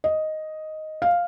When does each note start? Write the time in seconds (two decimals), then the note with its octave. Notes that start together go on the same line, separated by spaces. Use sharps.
0.04 D#5
1.02 F5